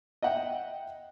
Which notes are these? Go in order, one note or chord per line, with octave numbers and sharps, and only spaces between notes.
D#5 E5 F#5 G5